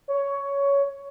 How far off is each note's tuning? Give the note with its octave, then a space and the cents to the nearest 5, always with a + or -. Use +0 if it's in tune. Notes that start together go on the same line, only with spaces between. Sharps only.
C#5 +10